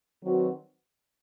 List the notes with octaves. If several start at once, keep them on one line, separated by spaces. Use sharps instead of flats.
D#3 F#3 C4 F#4 B4